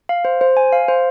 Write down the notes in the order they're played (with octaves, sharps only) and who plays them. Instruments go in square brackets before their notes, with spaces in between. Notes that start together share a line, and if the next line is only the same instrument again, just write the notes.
[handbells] F5
C5
C5
G#5
F5
C5